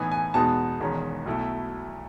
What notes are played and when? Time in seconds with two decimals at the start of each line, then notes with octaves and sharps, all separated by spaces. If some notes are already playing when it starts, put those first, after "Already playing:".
Already playing: A2 E3 B3 D#4 G#5
0.12 G#5
0.34 E2 B2 G#3 B3 D#4 A5
0.80 E1 E2 D#3 G#3 C#4
1.26 B1 B2 A3 E4